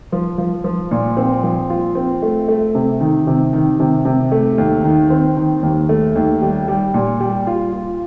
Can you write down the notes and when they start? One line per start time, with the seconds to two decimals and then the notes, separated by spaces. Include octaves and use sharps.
0.12 F3
0.38 F3
0.64 F3
0.91 A#2
1.17 C4
1.43 F3
1.70 F4
1.95 C4
2.22 A3
2.48 A3
2.75 C3
3.00 D#3
3.27 C3
3.53 D#3
3.80 C3
4.05 C3
4.32 A3
4.58 D#2
4.84 D#3
5.10 C4
5.37 D#3
5.63 D#2
5.89 A3
6.15 D#2
6.42 G3
6.68 G3
6.94 A#2
7.20 G3
7.47 F4
7.73 F4